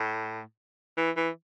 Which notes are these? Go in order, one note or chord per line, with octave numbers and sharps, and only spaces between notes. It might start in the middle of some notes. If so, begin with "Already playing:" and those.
Already playing: A2
E3
E3